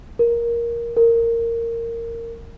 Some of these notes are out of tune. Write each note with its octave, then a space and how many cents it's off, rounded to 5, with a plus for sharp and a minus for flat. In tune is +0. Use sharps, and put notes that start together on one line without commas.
A#4 +10
A#4 -15